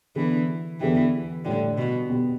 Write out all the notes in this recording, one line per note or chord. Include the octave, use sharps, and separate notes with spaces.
D3 E3 B3 D4
E2 D3 E3 B3 E4 G4
A2 D3 G3 E4 G4
B2
B2 B3 G4